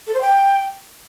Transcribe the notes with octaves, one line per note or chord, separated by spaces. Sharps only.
A4
C5
G5